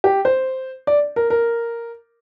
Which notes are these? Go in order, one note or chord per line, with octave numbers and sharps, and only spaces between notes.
G4
C5
D5
A#4
A#4